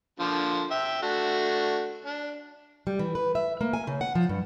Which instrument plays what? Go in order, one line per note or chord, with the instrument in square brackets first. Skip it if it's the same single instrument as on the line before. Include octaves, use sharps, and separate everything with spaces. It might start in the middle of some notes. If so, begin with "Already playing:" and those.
[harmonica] D3 F3 A#3
E5 G5
A3 D4 F#4
D4
[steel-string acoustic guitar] G3
E3
B4
E5
A#3
G#5
C#3
F#5
F3
G2